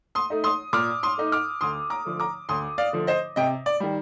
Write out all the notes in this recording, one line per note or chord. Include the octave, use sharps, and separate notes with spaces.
C6 D#6
A3 D#4
C6 D#6
A#2 D6 F6
C6 D#6
A3 D#4
D6 F6
D2 C6 D#6
A#5 D6
D3 F3 A3
A#5 D6
D2 C6 D#6
D5 F5
D3 F3 A3
C5 D#5
C3 D#5 G5
D5
D#3 G3